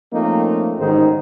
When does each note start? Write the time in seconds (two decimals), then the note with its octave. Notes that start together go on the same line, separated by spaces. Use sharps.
0.12 F3 A3 A#3 C4 C#4 D#4
0.78 A1 G#2 D#3 D#4 G#4 C5